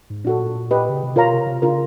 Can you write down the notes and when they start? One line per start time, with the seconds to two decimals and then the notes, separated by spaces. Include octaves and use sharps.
0.10 G#2
0.24 A#2 D4 F#4 A4
0.71 G4 B4 D#5
0.89 C#3
1.03 C3
1.16 B2 F4 A#4 C#5 F5 A#5
1.32 C3
1.46 C3
1.62 C#3 D4 F4 A#4